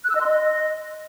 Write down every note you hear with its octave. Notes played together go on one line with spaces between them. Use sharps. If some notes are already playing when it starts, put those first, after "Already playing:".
F#6
E6
D#5
C6
D#5